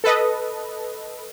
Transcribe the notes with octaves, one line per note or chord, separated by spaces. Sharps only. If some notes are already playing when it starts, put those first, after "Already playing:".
A4 B4 D#5